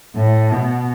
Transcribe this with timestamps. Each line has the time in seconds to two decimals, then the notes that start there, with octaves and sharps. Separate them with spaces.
0.16 A2
0.51 B2